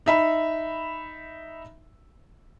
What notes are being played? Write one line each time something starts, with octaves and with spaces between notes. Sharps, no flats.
D#4 E5 B5